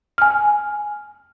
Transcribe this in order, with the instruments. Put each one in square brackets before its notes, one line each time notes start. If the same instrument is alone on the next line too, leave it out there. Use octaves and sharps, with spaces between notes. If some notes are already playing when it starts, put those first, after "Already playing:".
[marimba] G#5 F6